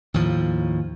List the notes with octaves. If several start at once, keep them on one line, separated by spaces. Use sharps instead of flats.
D#2 A2 F3